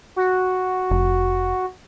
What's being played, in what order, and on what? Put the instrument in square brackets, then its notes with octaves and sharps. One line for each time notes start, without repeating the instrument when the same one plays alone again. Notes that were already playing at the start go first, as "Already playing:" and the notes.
[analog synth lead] F#4
[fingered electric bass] F1